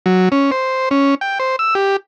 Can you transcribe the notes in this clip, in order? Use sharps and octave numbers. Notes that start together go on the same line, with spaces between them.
F#3
C#4
C5
C#4
G5
C5
E6
G4